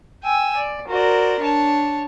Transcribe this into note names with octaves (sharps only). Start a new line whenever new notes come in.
G5 G#5 E6
D5
F#4 A#4 C5 D5
D4 C#5 A5